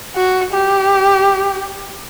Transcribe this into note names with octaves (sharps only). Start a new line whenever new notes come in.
F#4
G4